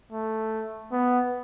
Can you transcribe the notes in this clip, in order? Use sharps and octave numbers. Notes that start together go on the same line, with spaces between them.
A3
B3